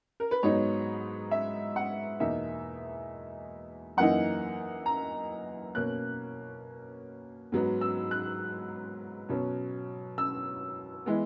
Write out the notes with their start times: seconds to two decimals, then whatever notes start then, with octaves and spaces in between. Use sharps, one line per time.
0.20 A#4
0.31 B4
0.43 G#2 F#3 B3 D#4 C#5
1.31 E5
1.76 F#5
2.20 E2 B2 A#3 D#4 E5
3.97 F#2 E3 A#3 D#4 F#5
4.86 A#5
5.75 B2 A#3 C#4 F#6
7.52 G#2 F#3 B3
7.81 E6
8.11 F#6
9.29 B2 F#3 C#4
10.18 E6
11.06 E3 G#3 B3